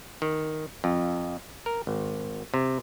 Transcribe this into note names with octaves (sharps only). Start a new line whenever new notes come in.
D#3
F2
A#4
G#1
C3